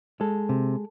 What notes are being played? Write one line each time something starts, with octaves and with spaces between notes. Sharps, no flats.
G#3 A4
C3